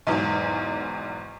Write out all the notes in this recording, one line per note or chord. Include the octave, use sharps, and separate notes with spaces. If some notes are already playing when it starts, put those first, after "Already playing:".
B1 E2 G#2